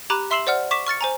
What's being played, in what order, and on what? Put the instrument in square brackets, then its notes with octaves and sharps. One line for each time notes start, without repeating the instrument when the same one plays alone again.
[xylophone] G4 A#5 B5 D6 F#6 D#7
E5 C6 E6 C7 E7 F#7
C5 D5 F#5 F6
C#6 D6 B6 E7
C#6 F6 A6 C#7
C5 G#5 A#5